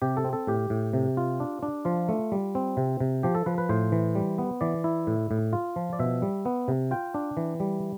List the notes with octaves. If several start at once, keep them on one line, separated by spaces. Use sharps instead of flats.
C3 G4
A4
C4
A4
A2 G4
A2
C3
F4
D4
D4
F3 F4
A3
G3
C4
C3
C3
F3 G4
A4
F3 B4
B4
A2 C5
E3
G3
B3
E3 D5
E4
A2
A2
F4
F3
D5
B2 E5
G3
B3
C3
F4 G5
D4
E3
G3